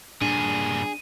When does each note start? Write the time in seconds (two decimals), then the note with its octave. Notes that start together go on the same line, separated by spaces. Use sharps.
0.22 G2 A#2 D4 G#4 D#7